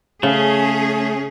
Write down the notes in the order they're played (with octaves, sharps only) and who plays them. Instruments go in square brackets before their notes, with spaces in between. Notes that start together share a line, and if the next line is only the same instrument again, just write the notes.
[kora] C#3 [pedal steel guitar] A3 [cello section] C#4 G#4